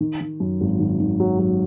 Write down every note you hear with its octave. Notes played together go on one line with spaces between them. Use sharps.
D#3
D#3
F#2
G#1
D#3
D#3
F#3
F#3